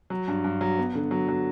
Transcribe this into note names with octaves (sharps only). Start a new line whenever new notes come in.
F#3
G2
G2
F#3
B3
D3
F#3
F#3